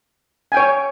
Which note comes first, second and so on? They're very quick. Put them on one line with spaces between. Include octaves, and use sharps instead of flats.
G#5 G5 C#5